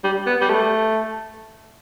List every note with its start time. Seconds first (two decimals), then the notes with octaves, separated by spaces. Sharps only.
0.04 G3
0.27 B3
0.41 G3
0.50 A3